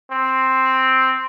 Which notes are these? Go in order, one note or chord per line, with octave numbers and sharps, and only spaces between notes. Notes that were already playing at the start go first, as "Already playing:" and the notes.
C4